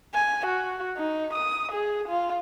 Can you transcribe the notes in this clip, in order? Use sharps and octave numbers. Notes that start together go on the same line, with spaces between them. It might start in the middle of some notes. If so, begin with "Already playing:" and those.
G#5
F#4
D#4
D#6
G#4
F4